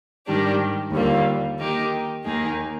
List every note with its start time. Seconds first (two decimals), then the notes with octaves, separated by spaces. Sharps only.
0.27 G#2 D#3 G3 D4 G4
0.92 D#2 D3 G3 A#3 F4
1.59 D#3 A#3 D#4 G4
2.24 D#2 D#3 A#3 D#4 G#4